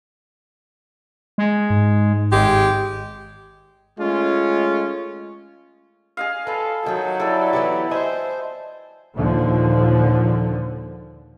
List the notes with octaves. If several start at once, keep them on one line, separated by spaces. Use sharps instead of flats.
G#3
G#2
G#1 G#3 G4
G#3 A3 C#4 F4
G#4 D#5 F5
B3 F4 A4
D#3 F#3 G#4 G5
G3 E4 A4 D5
E3 B3 G4
C5 D#5 E5 G#5
D#2 A#2 D3 F3